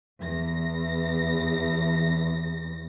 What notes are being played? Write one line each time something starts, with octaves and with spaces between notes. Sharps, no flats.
E2 A#6